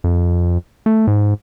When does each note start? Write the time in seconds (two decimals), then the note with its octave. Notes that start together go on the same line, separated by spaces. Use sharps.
0.04 F2
0.86 A3
1.07 G#2